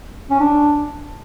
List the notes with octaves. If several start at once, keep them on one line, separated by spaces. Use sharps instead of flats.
C#4
D4